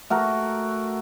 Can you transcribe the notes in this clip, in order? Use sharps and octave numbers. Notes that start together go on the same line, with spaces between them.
A3 F#4 A#4